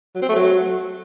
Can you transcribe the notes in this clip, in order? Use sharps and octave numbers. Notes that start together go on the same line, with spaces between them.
F#3
C4
A3
F#3